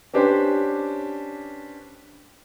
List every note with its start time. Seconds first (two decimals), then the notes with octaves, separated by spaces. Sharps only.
0.14 C#4 D4 G4 B4 C5